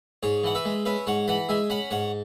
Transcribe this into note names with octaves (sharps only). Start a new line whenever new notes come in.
G#2 G#4 C#5
E3 F#5
B4 E5
G#3
C#4 B4 E5
G#2 C#5 F#5
E3 F#5 B5
G#3 E5 G#5
C#4 F#5 B5
G#2 C#5 F#5